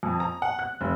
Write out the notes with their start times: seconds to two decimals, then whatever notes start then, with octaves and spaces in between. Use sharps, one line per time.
0.03 F2
0.20 A#5
0.42 F#5
0.59 F#6
0.81 F1